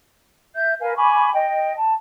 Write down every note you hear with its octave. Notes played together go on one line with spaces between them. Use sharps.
E5 G6
A#4 B4 F5 G#5
G#5 B5 C#6 D6
D#5 G5
A5